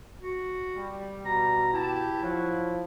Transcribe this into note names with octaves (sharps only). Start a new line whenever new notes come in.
F#4
G3
B2 A#5
E4 G4 A5
F3 F#3 F4 F#4